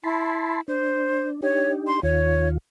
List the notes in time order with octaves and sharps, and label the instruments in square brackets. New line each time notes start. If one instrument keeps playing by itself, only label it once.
[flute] E4 [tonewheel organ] A5 B5 C6
[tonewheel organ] D4 [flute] C5
[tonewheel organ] D4 D#4 G4 [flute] C#5
[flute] C6
[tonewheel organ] D#2 D#3 F4 [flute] C#5